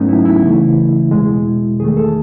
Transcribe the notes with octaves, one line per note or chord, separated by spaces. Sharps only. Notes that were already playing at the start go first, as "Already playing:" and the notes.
Already playing: G#2 F#3 A3 B3 C#4 D#4
E4
E4
C#2 C#3 E3 A3
E2 B2 G#3
E2 D#3 A3 G#4
A4